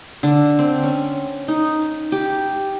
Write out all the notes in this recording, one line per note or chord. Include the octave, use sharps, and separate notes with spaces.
D3
C4
C#4
D#4
G4